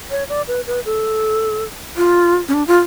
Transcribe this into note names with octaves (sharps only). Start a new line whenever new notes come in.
C#5
D5
B4
B4
A4
F4
C#4
D4
F4